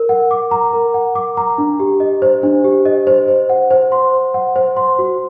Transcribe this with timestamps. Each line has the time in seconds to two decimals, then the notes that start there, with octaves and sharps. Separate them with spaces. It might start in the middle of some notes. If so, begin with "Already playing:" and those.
Already playing: A#4
0.09 F#5
0.31 D6
0.51 A#5
0.73 A#4
0.94 F#5
1.15 D6
1.37 A#5
1.58 D4
1.80 G4
2.00 D#5
2.22 C5
2.43 D4
2.64 G4
2.85 D#5
3.07 C5
3.28 C5
3.49 F#5
3.71 C5
3.92 C6
4.13 C5
4.34 F#5
4.56 C5
4.77 C6
4.99 F#4